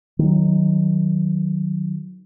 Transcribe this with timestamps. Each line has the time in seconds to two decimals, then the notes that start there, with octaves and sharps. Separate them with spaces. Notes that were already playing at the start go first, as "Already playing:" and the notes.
0.19 D#3 F#3